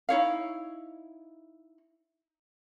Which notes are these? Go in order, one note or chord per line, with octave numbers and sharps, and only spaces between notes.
D#4 E4 C#5 F5